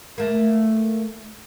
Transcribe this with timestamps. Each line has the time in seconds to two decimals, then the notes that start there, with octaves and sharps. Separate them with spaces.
0.18 A3 A#3